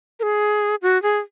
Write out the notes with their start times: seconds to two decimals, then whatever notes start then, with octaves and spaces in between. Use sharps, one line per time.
0.20 A#4
0.23 G#4
0.82 F#4
1.03 G#4